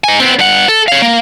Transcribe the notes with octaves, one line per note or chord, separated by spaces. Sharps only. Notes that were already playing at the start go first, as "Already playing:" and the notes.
D#4 G#5
B3 C4
G2 F#5
A4
C#5 F5
A#3